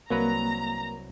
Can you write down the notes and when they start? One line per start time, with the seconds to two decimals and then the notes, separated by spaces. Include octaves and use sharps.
0.10 C2 F#3 A#3 B4 A#5